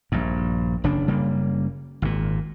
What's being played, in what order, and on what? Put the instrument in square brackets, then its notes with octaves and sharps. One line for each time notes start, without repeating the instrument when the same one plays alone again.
[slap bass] A#1 G2
F#1 C#3 D4
F#1 C#3 G3 A#3
G#1 A#2